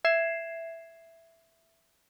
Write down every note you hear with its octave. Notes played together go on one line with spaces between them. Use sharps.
E5 G#6 C7 E7